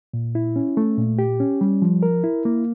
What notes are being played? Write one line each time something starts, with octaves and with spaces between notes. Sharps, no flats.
A#2
E4
C#4
A3
A#2
G4
C#4
G3
F3
A#4
E4
A#3